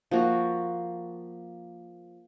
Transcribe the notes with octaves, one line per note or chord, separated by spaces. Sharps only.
F3 A#3 F#4